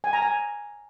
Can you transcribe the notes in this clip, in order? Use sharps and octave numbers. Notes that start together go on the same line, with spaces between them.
G#5
A#5
G#5